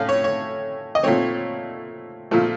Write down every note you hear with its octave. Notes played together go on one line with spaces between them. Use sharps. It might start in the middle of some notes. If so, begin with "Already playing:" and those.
Already playing: A2 A3 C#4 F5
C#5
C#5
D#5
A#2 A3 C4 C#5
A#2 F3 A3